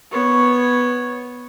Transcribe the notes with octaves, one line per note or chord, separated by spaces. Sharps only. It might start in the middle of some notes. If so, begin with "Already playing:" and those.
B3 C#5